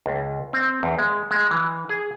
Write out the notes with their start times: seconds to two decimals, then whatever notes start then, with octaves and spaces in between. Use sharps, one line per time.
0.06 C#2
0.53 C4
0.83 E2
0.99 G#3
1.31 G#3
1.51 E3
1.89 G#4